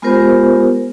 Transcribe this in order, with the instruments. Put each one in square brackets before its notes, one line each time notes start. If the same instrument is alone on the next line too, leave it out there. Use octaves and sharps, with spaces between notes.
[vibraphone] G#3 B3 F4 G4 A#4 C5